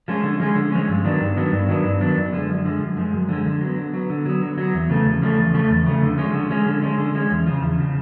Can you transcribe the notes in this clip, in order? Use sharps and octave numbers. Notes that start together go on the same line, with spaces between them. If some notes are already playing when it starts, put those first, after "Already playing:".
F3 G#3 C#4
D3
F3 G#3 C#4
D3
F3 G#3 C#4
G2
D#3 F#3 B3 D4
G2
D#3 F#3 B3 D4
G2
D#3 F#3 B3 D4
G2
D#3 F#3 B3 D4
F#2
D3 F3 G#3
F#2
D3 F3 G#3
F#2
D3 F3 G#3
F#2
D3 F3 G#3
D3
F#3 B3
D3
F#3 B3
D3
F#3 B3
D3
F#3 B3
E2
C#3 F3 A3
E2
C#3 F3 A3
E2
C#3 F3 A3
E2
C#3 F3 A3
D3
F3 G#3 C#4
D3
F3 G#3 C#4
D3
F3 G#3 C#4
D3
F3 G#3 C#4
E2
C#3 F3
E2
C#3 F3